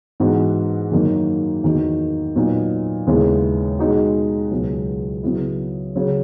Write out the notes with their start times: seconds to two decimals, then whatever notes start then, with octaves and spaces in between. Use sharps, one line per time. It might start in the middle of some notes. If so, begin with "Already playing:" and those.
0.20 G#2 E3 B3 D#4 F#4
0.92 F#2 D#3 F#3 A#3 D#4
1.63 E2 D#3 A#3 D#4 F#4
2.36 A#2 F#3 B3 D#4
3.07 D#2 C#3 G#3 B3 E4
3.79 B2 G#3 D#4 F#4
4.51 C#2 B2 F#3 B3
5.23 C#3 F#3 B3 E4
5.95 C#3 F#3 C#4